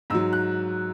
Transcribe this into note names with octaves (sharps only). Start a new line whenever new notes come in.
G#2 F#3 E6
F#6